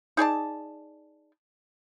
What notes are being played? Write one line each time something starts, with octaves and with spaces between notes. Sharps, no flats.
D#4 G#4 D5 A5